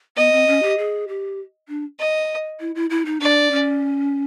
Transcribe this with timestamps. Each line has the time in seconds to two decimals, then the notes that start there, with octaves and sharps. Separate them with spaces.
0.16 B3 D#5
0.32 C4
0.47 C#4
0.63 G4
0.78 G#4
1.08 G4
1.68 D4
1.99 D#5
2.60 E4
2.75 E4
2.90 E4
3.06 D#4
3.21 D4 D5
3.51 C#4